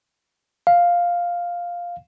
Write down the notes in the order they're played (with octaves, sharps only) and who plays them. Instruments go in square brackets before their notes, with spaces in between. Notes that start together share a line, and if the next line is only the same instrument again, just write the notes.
[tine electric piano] F5